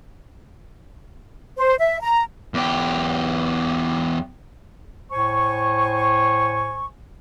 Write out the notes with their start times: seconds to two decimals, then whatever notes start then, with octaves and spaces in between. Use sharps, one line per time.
1.57 C5
1.79 E5
2.03 A#5
2.54 E2 G4
5.12 A2 C5 G#5 C#6